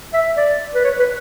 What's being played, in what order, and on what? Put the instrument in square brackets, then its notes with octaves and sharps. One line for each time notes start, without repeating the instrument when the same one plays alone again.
[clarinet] E5
D5
B4
C#5
B4